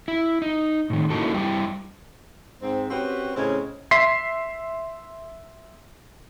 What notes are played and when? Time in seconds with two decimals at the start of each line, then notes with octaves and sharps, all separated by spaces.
0.08 E4
0.42 D#4
0.90 A2 D#3
1.10 A#3 C#4 D#4 E4 F#4 A4
1.34 G2 G3 E4 G5
2.62 G#2 C4
2.91 C4 C#4 F#4 G4 B4
3.36 A2 C#3 C4 C#4 D#5
3.91 E5 C6 B6 C7